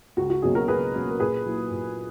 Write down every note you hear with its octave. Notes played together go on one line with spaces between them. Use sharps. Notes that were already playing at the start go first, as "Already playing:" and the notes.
C#2 F#4
F#4
B2 F#3 A#3 C#4 G#4
F#4 A#4
C#2 G#4 B4
B2 F#3 A#3 C#4
A#4
A#2 G#4 B4
F#3 A#3 E4
A#2